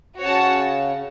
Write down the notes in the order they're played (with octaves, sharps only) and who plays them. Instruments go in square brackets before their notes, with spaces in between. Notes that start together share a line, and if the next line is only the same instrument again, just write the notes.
[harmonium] C#3 [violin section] F#4 C#5 F#5 A5